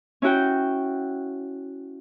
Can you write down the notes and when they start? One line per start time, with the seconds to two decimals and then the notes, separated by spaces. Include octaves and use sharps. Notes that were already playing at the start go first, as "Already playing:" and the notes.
0.22 C#4 E4 F#4 G5